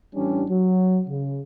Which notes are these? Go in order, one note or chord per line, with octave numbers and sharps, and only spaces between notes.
A1 E3 G3 C#4 D4
F#3
C#3